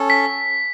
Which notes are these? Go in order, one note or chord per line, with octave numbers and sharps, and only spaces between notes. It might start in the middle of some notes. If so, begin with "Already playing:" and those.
Already playing: C#4 A4
B6